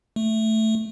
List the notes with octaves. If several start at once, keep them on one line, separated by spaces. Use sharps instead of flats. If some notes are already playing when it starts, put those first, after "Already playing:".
A3